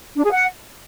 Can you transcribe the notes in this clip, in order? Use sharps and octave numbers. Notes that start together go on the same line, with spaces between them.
D4
G#4
F#5